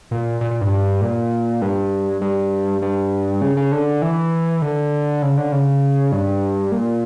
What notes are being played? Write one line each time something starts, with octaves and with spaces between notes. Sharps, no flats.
A#2
A#2
A#2
G2
A#2
G2
G2
G2
C#3
C#3
D3
E3
D3
C#3
D3
C#3
G2
A#2